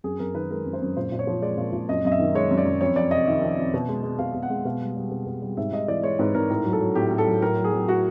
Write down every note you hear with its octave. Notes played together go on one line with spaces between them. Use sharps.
F#2 G#4
F#2 A#4
D#3 B4
G#3 A#4
F#2
C5
F#2
A#2 C5
A#2
C#5
F3
G#3 D5
A#2
A#2
F#2 D#5
F#2 D#5
E5
D#3
G#3 C#5
F#2
D5
F#2
F2 C#5
F2 D5
C3 D#5
D#3 E5
F2
F2
B2
G#3
G#3
B2 F5
B2
F#5
G#3
B2 F5
G3
G3
B2
B2
G3
G#2 E5
G#2 D#5
E3 D5
G#3 C#5
G#2 B4
G#2 A#4
A2 A#4
F#3
A4
F#3
A2 G4
A2
A4
F#3
A2 A#4
F#3
G#4
F#3
A2 F#4